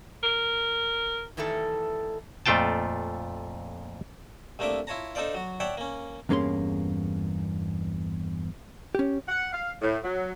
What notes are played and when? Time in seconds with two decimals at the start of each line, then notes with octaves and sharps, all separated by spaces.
0.23 A#4
1.37 D#3 E3 G3 A3 A4
2.46 F2 A#2 A3 F4 G5 A5
4.59 C2 A3 A#3 D4 E5 D6
4.87 E4 F4 C#5 A5 A#5
5.15 D4 D#4 A4 C5 D5 F5
5.34 F#3 F#4
5.60 C#5 D5 E5 F#5 G5 A5
5.77 A#3 C#4
6.29 E2 G2 A#3 C#4 G#4 C6
8.95 C#4 G4
9.29 F#5
9.53 F5
9.82 A2
10.04 F#3